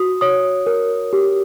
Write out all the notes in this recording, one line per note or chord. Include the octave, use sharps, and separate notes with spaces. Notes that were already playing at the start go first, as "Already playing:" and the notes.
Already playing: F#4 D#6
C#5 D#6
A#4
G4